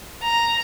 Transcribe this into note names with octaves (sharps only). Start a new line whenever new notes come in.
A#5